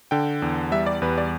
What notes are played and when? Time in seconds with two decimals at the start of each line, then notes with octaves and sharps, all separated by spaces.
0.11 D3 G5
0.42 E2
0.72 G3 E5
0.86 D5
1.02 E2 B4
1.18 D5